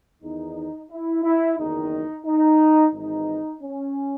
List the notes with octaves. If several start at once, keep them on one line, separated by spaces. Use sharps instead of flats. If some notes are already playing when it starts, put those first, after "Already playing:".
E2 D#3 D#4
E4
E4
F#1 E2 D#3 D#4
D#4
G#1 G#2 E3 D#4
C#4